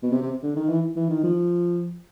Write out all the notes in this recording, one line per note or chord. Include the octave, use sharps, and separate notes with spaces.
B2
C3
C3
D3
D#3
E3
E3
D#3
F3